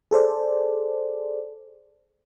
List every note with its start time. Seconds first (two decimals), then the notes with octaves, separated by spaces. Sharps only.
0.11 G#4 A4 C5 D5